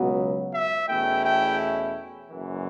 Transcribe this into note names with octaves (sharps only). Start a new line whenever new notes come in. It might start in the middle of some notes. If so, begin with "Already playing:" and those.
Already playing: C#2 B2 F#3 B3
E5
E2 B2 A3 C#4 E4 G5
G5
F#1 F#2 E3